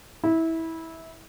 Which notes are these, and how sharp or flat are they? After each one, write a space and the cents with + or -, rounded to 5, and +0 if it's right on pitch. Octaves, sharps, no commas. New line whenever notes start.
E4 -20